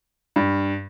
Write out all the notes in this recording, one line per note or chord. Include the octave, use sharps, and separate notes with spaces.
G2